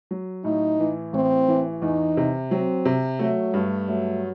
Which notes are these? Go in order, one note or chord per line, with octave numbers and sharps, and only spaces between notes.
F#3
A2 D#4
E3
A1 C4
E3
E2 D#4
C3
F#3 C4
C3
F#3 A3
G2
F#3 A3